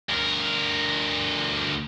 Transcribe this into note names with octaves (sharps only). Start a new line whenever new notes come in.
D2 A#4